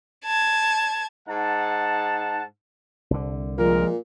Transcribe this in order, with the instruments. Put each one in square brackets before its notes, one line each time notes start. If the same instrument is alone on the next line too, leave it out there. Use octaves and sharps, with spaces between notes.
[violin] A5 G#6
[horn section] G#2 D#4 F#5 A5
[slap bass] C2 D3
[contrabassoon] A#2 [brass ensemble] F3 G#3 A#4